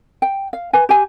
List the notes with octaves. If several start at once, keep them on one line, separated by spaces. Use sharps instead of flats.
G5
F5
B4 G#5
G4 G#5